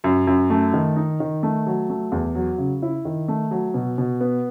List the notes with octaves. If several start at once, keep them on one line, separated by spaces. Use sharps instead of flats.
F#2
F#2
A3
D#3
D#4
D#3
A3
F#3
A3
E2
F#3
C#3
E4
D#3
A3
F#3
B2
B2
B3